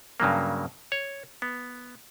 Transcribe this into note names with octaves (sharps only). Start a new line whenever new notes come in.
G2 C#3 F#3 A#3
C#5
B3